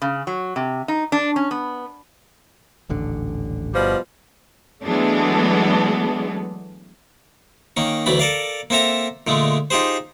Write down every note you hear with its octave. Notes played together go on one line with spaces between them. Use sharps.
C#3
F#3
C3
D#4
D4
C#4
B3
D#1 A1 D3
G1 B2 F3 G3
E3 F#3 G#3 A3 B3 D4
D#3 A#3 C#4
D2 E3 F#3 D4 B5
A4 A#4 D5 F5
A#3 C4 A4 E5 A#5
A#2 D3 G#3 A3
D#4 F4 G4 G#4 C5